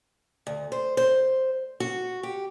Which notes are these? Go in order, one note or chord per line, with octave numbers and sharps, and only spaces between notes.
D2
C5
C5
F#4
G4